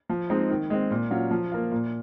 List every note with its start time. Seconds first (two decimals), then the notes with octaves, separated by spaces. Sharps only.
0.09 F3
0.30 G#3 C4 D#4
0.50 D#3
0.70 G#3 C4
0.91 A#2
1.10 F#3 C#4 F4
1.31 F3
1.52 A#3 F4
1.71 A#2